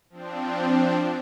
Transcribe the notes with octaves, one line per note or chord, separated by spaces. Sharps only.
F3 C4 D4